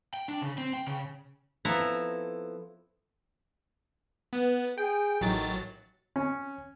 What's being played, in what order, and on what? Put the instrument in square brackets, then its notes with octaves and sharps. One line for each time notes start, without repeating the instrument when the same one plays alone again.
[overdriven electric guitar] G5
D4
C#3
C4
G5
C#3
[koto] F3 B3 C4 E4 A4 A#5
[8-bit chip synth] B3
[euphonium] G#4 [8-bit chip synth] G5
[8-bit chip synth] A1 F#3 A6 [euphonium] D#3
[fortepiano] C#4